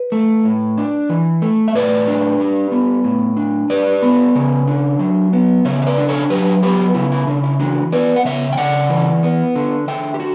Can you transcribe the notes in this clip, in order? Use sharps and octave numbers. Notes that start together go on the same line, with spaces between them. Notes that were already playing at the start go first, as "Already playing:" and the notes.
Already playing: B4
A3
A2
D4
E3
A3
E5
A2 B4 D5
D4
G3
B3
A2
D4
G3 B4 D5
B3
C#3
D4
F#3
B3
C#3 C#5 E5
E5
B4 D5
D4
A4 C#5
F#3 G4 B4
B3 G4 B4
C#3 E4
E4
C#3 D4
E4
E3 D4 F#4
B3 B4 D5
F#5
C#3 C#5 E5
G5
C#3 D5 F#5
E3
B3
D3
D3 E5 G5
G4
F#4